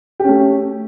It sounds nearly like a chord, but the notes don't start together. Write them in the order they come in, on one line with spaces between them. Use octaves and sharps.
G4 C#4 A3